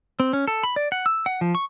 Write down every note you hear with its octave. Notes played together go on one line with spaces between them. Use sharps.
C4
C#4
A4
B5
D5
F#5
E6
F#5
F3
C#6